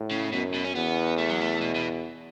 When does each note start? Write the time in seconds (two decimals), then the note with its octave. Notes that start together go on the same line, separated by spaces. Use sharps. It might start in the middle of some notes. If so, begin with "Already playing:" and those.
Already playing: A2
0.11 C#3
0.32 F#2 B2
0.54 B2
0.64 C#4
0.75 E2 B3
1.18 A3
1.29 F#3
1.40 A3
1.60 B2
1.75 B2